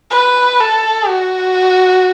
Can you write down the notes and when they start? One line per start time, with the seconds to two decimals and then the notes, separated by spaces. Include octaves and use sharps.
0.11 B4
0.60 A4
1.09 F#4